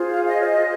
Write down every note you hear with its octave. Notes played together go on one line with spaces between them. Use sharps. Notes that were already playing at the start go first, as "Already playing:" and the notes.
Already playing: F4 G#4 C5
F5
D#5
C#5
D#5